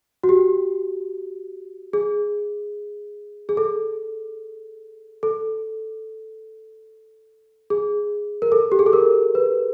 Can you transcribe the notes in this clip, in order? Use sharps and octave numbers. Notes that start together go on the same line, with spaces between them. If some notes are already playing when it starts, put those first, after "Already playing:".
F#4
G4
G#4
G#4
A4
A4
G#4
A#4
A4
G4
G#4
A4
A#4
B4